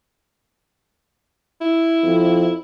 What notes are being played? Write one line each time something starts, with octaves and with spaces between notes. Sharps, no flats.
E4
F2